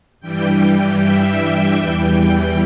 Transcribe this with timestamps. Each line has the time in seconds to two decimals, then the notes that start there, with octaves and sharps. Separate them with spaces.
0.20 G2 E3 G3 G5
1.00 E5
1.78 E2 E3 G3 G5